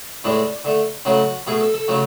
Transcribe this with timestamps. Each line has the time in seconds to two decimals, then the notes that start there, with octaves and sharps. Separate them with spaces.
0.24 A2 E3 G#3 D4
0.65 D3 A3
1.05 C#3 F#3 A3 F#4
1.47 B2 A3 G#4
1.60 A4
1.74 A4
1.88 C#3 F#3 A3